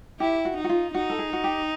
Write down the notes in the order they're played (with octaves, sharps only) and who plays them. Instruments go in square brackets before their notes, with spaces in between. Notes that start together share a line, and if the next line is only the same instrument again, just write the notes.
[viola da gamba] E4 [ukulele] G4
[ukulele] F#4
[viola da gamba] D#4
[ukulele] F#4
F4
[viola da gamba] D#4 [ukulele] F#4
[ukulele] A4
G#4
F#4
G4